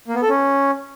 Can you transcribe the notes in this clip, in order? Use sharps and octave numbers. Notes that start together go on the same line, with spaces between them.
A#3
B3
A4
C#4